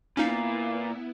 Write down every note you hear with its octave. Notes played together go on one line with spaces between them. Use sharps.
A#2 B3 C#4 D#4 E4 F5